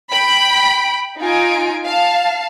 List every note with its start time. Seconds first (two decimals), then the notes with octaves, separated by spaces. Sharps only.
0.11 G5 B5 D7
1.19 D#4 F4 G#5 D7
1.85 F5 A5